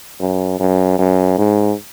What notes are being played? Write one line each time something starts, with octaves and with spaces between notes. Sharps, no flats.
F#2
F#2
F#2
G#2